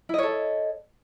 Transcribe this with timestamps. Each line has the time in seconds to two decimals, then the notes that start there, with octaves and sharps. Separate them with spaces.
0.09 E4
0.14 D#5
0.18 C#5
0.23 A4